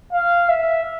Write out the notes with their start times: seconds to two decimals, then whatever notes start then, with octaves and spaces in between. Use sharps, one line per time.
0.13 F5
0.49 E5